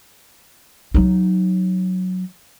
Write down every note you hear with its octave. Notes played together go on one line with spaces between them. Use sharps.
F#3 D#4